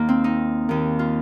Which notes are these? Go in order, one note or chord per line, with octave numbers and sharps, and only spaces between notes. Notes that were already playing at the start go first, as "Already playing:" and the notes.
Already playing: D#2 D#3 A#3
C4
D#4
D#2 D#3
F4